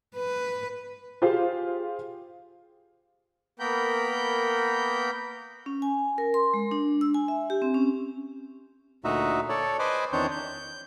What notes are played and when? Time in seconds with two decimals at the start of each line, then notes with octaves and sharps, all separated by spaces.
0.16 B4
1.22 F4 G4 G#4 C5 F5
3.59 A#3 B3 A#4 G5 B5 G6
5.66 C#4
5.82 G#5
6.18 A#4
6.34 C6
6.54 G#3
6.71 D4
7.01 E6
7.14 G#5
7.28 E5
7.50 G4
7.62 C4
7.74 C#4
9.04 D2 A#2 D#4 F#4 E5
9.49 A4 C#5 D5
9.79 B4 C5 D#5 G#5 D6
10.13 E2 D#3 C4 D4 C#5 G6
10.31 G6